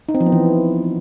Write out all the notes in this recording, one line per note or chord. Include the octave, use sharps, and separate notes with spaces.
D#4
C4
F3
B3
E3